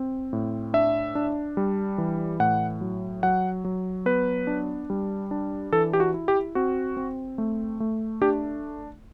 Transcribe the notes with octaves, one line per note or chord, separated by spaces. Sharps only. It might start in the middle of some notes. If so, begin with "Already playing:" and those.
Already playing: C4
A2
D4 E5
D4
G3
E3
A2 F#5
F#3
F#3 F#5
F#3
B3 B4
D4
G3
D4
E3 A4
G4
F#4
E4
G4
C4 F#4
C4
A3
A3
D4 G4